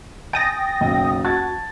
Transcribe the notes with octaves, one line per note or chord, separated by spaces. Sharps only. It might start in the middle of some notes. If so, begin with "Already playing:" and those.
G5 G#5 D#6 A6 A#6
F#1 B1 D#5
F#4 A5 G#6 A6